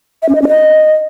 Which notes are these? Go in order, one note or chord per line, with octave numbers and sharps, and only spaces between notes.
E5
C#4
D#5
C#4
D#5